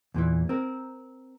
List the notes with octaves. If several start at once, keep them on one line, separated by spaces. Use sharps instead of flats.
E2 A#2 D3 E3
C4 A#4